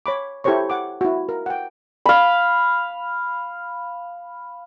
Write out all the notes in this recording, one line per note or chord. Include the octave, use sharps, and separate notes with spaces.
C#5 B5 D6
E4 G4 A4 C5 C#5 C#6
F#5 D6
E4 F#4
A#4
F#5 G5
F5 B5